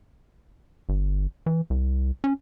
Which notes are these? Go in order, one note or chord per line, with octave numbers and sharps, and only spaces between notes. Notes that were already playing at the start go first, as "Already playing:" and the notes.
G1
E3
C2
C#4